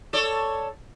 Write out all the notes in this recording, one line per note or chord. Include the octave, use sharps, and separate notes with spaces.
A4 C#5 D5